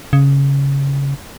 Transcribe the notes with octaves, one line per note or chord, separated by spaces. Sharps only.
C#3